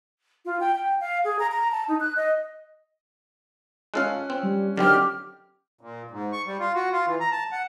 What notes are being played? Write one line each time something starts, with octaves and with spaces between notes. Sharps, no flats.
F4
G5
G5
F5
G#4
A#5
A#5
A5
D#4
F#6
D#5
G#3 C#4 F4 A4 F5 F#6
C4
G3
D3 D#3 F#3 C4 G4 F6
A#2
G#2
C#6
G3
F4
F#4
F4
E3
A#5
A5
F#5